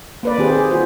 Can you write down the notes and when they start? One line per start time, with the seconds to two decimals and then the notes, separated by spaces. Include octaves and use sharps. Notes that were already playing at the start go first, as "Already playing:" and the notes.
0.23 A#3 B4 D5
0.38 D#3 C4 G4 G#4 C5
0.55 G#4
0.71 F4 F#4 C5